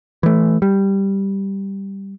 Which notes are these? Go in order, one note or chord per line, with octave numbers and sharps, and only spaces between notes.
E3 A3
G3